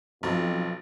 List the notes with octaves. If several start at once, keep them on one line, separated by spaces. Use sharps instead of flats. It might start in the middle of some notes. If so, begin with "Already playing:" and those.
B1 F2